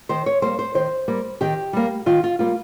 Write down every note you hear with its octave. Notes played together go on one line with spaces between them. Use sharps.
D#3 C5
C#5
G3 A#3 C5
C5
D#3 C5
G3 A#3
D#3 G4
G3 A#3
D#3 F4
F4
G3 A#3 F4